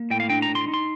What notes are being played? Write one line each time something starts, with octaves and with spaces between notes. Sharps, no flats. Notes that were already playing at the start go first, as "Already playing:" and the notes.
Already playing: A#3
A2 G5
F5
D4 G5
A#5
A2
C6
D#4
C6